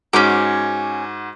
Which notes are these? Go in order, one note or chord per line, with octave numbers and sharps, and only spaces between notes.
G#2 C#4 F#4 D6